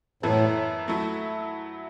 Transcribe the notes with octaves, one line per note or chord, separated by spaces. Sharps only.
F#2 A2 E3 B3 E4 A4
F#3 A3 E4